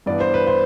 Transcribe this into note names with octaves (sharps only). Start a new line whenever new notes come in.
G2 E3 B3 D5
C5
B4
C5